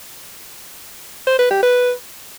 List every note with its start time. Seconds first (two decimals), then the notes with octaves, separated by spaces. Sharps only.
1.27 C5
1.39 B4
1.51 G4
1.63 B4